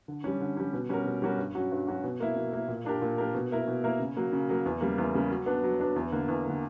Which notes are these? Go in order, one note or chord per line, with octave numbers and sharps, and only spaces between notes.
D3
G3 C#4
D3
G3 C#4
B2
G3 C#4 F#4 A#4
B2
G3 C#4 F#4 A#4
G2
F#3 C#4 F#4
G2
F#3 C#4 F#4
B2
A#3 E4
B2
A#3 E4
A#2
A#3 D4 G4 A#4
A#2
A#3 D4 G4 A#4
B2
A#3 E4 A#4
B2
A#3 E4 A#4
C#3
F#3 A#3
C#3
F#3 A#3
E2
C#3 G3 A#3
E2
C#3 G3 A#3
F#3
B3 D4
F#3
B3 D4
E2
D3 A#3
E2
D3 A#3